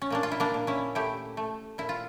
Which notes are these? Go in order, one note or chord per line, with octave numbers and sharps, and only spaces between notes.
C#4
A#2 A#3 D4
F4
E4
A#3 D4
A#2
C#4 E4
A3 E4 G4
A3
A#2 E4
F4